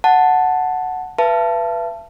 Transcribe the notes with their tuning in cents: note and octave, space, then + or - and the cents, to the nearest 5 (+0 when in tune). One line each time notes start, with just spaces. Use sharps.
F#5 +0 A5 +0
B4 -5 E5 +40 A5 +0